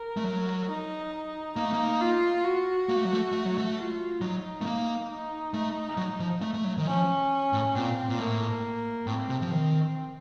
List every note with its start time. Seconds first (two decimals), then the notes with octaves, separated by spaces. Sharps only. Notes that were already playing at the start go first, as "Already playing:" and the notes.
Already playing: A#4
0.17 A3
0.24 F#3
0.67 D#4
1.56 A#3 D#4
1.65 A3
1.73 A#3
2.01 F4
2.44 F#4
2.89 A#3
2.96 A3
3.05 F#3
3.12 A3
3.32 A3
3.46 F#3
3.58 A3
3.77 F4
4.21 F#3 D#4
4.61 A3
4.66 A#3
5.10 D#4
5.54 A3
5.97 F#3
6.20 F3
6.42 A3
6.54 A3
6.64 F#3
6.77 D#3
6.86 F3 C#4
7.53 A2
7.75 A#2 C4
8.09 A#2
8.18 A2 A#3
9.06 A2 C4
9.29 C3
9.42 F3
9.51 D#3 C4